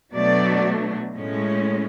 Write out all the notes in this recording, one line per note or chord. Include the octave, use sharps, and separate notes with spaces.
B2 F#3 A3 D4 D5
A2 G#3 C#4